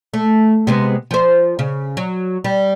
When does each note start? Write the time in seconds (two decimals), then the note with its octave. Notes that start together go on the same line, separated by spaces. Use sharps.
0.14 A3
0.67 C3 G#3 B3
1.11 F3 C5
1.59 C#3
1.97 F#3
2.44 G3